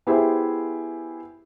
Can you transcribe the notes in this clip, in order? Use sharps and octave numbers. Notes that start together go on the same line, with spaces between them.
B3 E4 G4 G#4 C5 E5